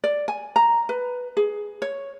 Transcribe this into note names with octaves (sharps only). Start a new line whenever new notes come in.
D5
G#5
A#5
B4
G#4
C#5